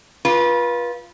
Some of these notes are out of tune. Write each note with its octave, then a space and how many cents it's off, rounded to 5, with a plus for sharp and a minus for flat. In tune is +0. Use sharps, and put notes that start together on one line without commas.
F4 +0 B4 -30